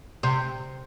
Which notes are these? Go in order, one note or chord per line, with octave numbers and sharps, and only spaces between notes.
C3